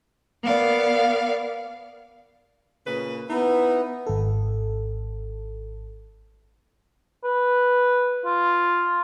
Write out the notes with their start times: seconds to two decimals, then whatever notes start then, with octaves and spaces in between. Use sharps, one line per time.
0.44 B3 A#4 D5 F5
2.87 A#2 C#3 B4
3.30 B3 D#4 E4
4.07 G#1 A4
7.24 B4
8.25 F4